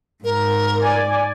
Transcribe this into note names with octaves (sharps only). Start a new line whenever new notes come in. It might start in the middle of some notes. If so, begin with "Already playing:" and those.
G#2 A#4
D5 G#5